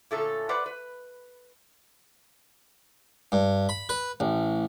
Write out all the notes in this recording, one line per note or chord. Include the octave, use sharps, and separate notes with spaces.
A#2 D3 A3 C#4 A4
B4 C5 D5 F#5
B4
G2
B5
B4
A1